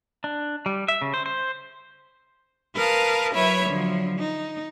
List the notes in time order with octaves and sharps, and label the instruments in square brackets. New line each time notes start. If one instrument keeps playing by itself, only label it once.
[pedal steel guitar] D4
G3
E5
C#3
C5
C5
[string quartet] A#4 B4 F5 A5 D#6
F#3 E4 B4 C#5 E5 B5
D3 F3 F#3
D#4